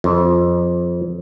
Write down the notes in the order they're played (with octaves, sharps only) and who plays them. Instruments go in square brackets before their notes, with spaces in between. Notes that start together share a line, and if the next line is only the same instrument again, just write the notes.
[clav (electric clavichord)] F2